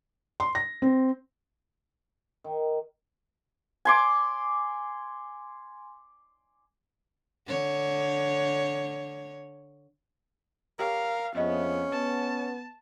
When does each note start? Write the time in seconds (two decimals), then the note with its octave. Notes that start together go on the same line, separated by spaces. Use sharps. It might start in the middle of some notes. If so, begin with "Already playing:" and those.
0.40 C6
0.55 A#6
0.82 C4
2.44 D#3
3.85 G#5 C6 D6
7.47 D3 C#5
10.79 G4 A#4 C#5 F5
11.35 F2 F3 B3 C#4 G#4 D#5 E5
11.92 B3 A5